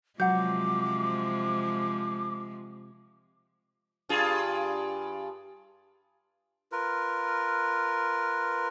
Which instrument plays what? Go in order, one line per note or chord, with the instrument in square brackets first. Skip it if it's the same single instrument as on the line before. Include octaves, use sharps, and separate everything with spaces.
[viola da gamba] C3 F3 G#3 [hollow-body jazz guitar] F#3 [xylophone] F#5 G6 [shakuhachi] D6
[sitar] G2 F4 G#4
[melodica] F4 A#4 B4